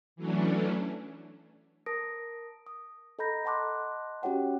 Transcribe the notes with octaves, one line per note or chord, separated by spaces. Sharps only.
E3 F#3 A3 C#4 D4
A#4 A5 D#6 A#6 D7
D#6
A4 D#5 A#5 B5 G6 A#6
D#5 F#5 A5 C6 D6 F#6
C#4 F#4 G4 C#5 F#5 G5